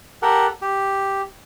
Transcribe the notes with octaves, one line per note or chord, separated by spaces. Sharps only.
G4 A4 A#4 F#5
G4